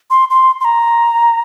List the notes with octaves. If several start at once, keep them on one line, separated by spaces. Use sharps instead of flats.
C6
C6
C6
A#5